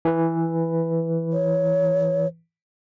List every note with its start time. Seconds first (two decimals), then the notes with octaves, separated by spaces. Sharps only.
0.05 E3 B4
1.33 C#5